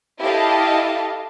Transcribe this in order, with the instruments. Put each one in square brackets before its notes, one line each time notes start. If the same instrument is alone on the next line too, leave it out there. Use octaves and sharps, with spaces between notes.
[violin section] E4 G4 A4 D#5 F5 A5